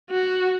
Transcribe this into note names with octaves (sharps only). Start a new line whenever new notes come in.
F#4